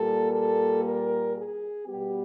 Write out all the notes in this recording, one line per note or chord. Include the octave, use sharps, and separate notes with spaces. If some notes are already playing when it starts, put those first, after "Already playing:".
Already playing: A#2 G3 A#3 A4
A4
A#4
G#4
B2 G3 B3 G4